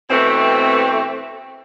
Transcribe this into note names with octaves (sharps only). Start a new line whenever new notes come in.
B2 E3 A3 C4